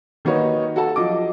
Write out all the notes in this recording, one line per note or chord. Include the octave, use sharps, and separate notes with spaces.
D#3 A#3 D#4 F#4 B4 C#5
F#4 A4 F#5 A5
F3 F#3 D#5 D6